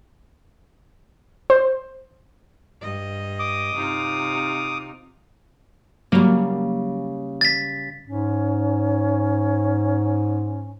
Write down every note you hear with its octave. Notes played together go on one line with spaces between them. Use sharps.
C5
G2 D#5
D6 D#6
C3 D#4 F4
C#3 F#3 G3 A#3
A6 B6
G#2 C#4